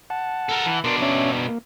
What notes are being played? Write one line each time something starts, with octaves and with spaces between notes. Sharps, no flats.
F#5 A5
A4 A#4
E3
B2 D4 A#4 C6
C#4 C#5 E5
A#3